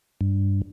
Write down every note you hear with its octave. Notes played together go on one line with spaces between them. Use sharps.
G2